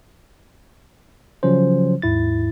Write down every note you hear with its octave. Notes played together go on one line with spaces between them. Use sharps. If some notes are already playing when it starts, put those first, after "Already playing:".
C#3 F3 F#3 C#4 C5
D#2 G#2 E4 A6